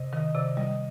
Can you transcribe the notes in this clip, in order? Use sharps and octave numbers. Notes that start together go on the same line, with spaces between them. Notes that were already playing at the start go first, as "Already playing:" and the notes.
Already playing: C3 D#5
D#3 D#5
C3 D5
G3 D#5